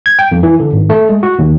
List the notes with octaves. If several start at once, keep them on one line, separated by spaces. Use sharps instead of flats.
G#6
G5
F2
E3
D3
G#1
A3
G#3
F#4
D#2